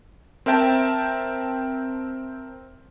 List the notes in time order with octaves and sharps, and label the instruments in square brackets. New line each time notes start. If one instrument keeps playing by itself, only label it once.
[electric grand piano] C4 A#4 E5 G5 A5